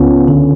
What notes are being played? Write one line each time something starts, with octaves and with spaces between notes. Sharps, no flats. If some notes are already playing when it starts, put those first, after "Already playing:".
Already playing: C#2 C#3 B3 C#4 F4
D3